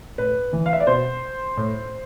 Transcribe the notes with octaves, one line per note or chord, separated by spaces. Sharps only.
A2 B4
E3
F5
E5
D5
B2 C5
A2